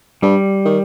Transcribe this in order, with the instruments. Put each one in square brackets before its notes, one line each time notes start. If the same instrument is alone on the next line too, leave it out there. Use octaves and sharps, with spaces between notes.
[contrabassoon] G2 [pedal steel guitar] G3
[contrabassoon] D#3